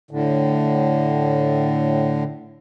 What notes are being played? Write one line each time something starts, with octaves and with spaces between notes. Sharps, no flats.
A2 D3